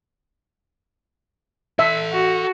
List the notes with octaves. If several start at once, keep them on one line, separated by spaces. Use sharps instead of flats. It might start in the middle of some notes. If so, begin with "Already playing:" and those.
A4 E5 C6
F#4